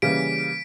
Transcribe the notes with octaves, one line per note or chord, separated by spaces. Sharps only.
C#3 E3 G3 A#3 B6 D7